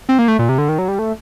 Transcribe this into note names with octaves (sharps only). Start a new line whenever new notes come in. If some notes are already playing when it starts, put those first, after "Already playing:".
C4
A#3
A3
A#2
C3
D3
D#3
F#3
G3
A3